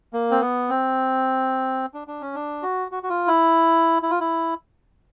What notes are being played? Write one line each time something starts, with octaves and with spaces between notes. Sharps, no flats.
A#3
C4
B3
C4
D4
D4
C#4
D4
F#4
F#4
F#4
F4
E4
E4
F4
E4